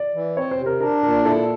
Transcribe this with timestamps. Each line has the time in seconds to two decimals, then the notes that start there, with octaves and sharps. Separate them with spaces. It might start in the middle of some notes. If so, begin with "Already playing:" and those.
Already playing: D5
0.14 E3
0.37 C4 C#5
0.51 C5
0.59 C3
0.66 A#4
0.81 D4 A#4
1.03 A#2 A#4
1.25 E4 A4